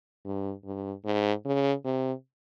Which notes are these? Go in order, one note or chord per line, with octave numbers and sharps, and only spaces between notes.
G2
G2
G#2
C#3
C3